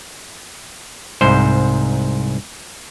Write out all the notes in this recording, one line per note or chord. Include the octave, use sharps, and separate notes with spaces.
C2 G#2 C5